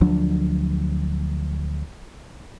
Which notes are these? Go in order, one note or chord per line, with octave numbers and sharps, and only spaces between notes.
D2 F3 F#3 D4